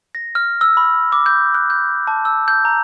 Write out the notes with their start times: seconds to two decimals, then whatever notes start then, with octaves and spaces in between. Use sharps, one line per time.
0.15 A#6
0.35 F6
0.61 E6
0.77 B5
1.12 D6
1.26 G6
1.54 F#6
1.70 G6
2.07 A5
2.25 E6
2.48 G6
2.65 A#5